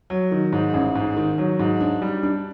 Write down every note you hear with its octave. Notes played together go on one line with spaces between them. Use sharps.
F#3
D#3
G#2
A1
G#2
D#3
F#3
G#2
D4
G3
D4